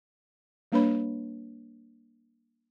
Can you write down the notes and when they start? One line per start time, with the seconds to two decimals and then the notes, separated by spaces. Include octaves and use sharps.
0.72 G3 A#3 D4 B4 C#5 B5